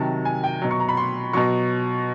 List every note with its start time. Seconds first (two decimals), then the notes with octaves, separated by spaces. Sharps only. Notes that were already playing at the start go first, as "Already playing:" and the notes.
Already playing: C3 D#3 F#3 A5
0.25 G#5
0.44 G5
0.62 B2 F#3
0.71 C#6
0.80 A#5
0.89 B5
0.97 C6
1.33 B2 F#3 C#6